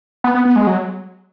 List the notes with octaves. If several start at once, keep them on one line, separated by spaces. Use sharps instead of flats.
B3
B3
B3
G#3
F#3